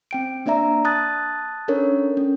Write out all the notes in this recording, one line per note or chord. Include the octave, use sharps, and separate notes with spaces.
C4 G5 D7
A#3 D4 D5 E5 A#5
A5 D#6 F#6 A6
C#4 D4 A4 A#4 C#5
C#4